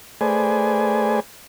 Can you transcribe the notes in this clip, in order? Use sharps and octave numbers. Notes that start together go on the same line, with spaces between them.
A3 G#4 B4 C5 D5 G#5